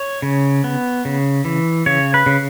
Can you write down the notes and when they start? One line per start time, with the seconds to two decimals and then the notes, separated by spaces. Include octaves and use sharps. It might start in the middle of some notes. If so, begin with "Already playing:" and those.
Already playing: C#5
0.22 C#3
0.64 B3
1.05 C#3
1.45 E3
1.86 C#3 C#5
2.14 B4
2.26 C#3